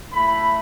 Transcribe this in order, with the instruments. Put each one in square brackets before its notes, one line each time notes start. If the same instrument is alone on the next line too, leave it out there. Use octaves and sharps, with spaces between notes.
[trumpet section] A3 E4 B5